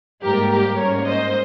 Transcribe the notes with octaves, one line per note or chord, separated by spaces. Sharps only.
G#2 G3 A#3 G4 A#4
G4 A#4
G#2 G3 A#3 C#4 A#4 C#5
C5 D#5